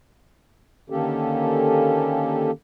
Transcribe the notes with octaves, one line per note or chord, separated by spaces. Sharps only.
D3 D#3 A#3 C#4 G4 A4